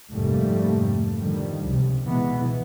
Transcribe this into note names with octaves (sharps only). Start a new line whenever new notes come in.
F1 G#2 G3 A3 A#3
D3 D#3 F3 G3
C#2 C3
B2 E3 G#3 B3